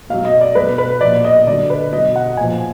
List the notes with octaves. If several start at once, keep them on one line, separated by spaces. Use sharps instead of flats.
B2 F#3 F5
D#5
D5
B2 F#3 B4
B4
A#2 F3 D5
D#5
D3 F#3 D5
B4
B2 F#3 D#5
F#5
A#2 F3 G#5